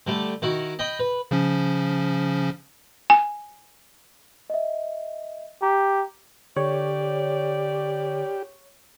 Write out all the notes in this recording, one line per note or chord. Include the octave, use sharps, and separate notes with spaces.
D3 G3 A3
D#3 E4 F#4
D#5 G5 B5 D#6
B4
C#3 F3 C#4
G#5
D#5 E5
G4 A#5
D3 G4 C#5 D5